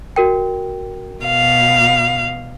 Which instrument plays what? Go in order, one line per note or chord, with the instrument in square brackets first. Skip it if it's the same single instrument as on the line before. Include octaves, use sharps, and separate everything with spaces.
[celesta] F#4 A#4 G5
[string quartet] B2 F5